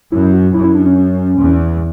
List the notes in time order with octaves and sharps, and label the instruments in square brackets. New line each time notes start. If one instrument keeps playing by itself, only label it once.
[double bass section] F#2 [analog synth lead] E4
[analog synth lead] F#4
[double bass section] F#2 [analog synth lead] E4
[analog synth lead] E4
D4
C#4
[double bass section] E2